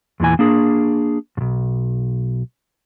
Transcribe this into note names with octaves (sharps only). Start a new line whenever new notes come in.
E2 A#2 E3 G#5
A#3 D4 G#4
B1 G2